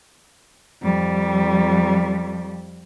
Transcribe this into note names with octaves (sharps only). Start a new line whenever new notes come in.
F2 G3